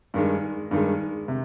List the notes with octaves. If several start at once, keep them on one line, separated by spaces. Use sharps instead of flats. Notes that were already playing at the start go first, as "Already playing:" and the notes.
G2 D#3 G#3
G2 D#3 G#3
C3